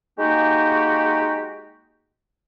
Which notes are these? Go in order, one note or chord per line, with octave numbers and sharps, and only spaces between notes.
G#3 A#3 D#4 F#4 G4